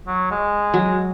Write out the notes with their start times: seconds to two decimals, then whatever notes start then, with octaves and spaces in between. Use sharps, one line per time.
0.07 F#3
0.31 G#3
0.74 F#3